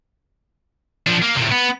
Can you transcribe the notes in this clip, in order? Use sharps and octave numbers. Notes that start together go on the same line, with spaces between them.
F3 D4
A#3
A2 C3
B3